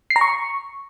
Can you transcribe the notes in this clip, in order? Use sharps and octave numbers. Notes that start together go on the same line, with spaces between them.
C7
A#5
C#6